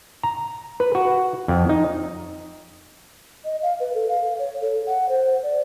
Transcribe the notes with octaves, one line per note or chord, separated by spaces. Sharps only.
A#5
B4
F#4
F2
D#4
D#5
F5
B4
A4
F5
C#5
A4
F#5
C5
D5